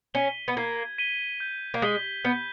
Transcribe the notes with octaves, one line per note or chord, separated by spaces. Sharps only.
C#4 B6 D#7 G7
B3
A#3 G#6
B6 D#7 G7
G6
A#3
G#3 B6 G7
B3 G6